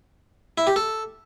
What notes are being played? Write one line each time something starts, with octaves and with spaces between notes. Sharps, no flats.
E4
G4
A4